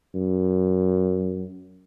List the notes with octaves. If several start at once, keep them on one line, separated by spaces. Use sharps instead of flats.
F#2